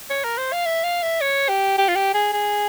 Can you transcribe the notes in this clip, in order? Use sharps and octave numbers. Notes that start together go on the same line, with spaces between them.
C#5
A#4
C5
F5
E5
F5
E5
C#5
G4
G4
F4
G4
G#4
G#4